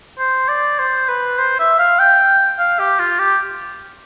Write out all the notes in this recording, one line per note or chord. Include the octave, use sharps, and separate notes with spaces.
C5
D5
C5
B4
C5
E5
F5
G5
F5
G4
F4
G4